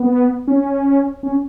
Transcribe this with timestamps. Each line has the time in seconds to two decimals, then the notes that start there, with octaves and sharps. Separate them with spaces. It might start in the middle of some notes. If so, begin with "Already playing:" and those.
Already playing: B3
0.48 C#4
1.23 C#4